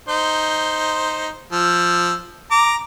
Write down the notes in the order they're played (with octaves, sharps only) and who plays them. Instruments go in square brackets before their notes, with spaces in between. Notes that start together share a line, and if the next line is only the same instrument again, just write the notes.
[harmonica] D#4 C5
F3 E6
A#5 D6